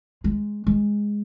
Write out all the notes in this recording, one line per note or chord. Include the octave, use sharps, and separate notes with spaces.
G#3
G#3